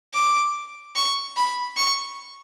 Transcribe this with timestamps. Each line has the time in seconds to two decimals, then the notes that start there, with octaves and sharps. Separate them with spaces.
0.15 D6
0.96 C#6
1.37 B5
1.77 C#6